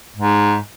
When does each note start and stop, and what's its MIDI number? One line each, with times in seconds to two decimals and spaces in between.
0.16 0.57 44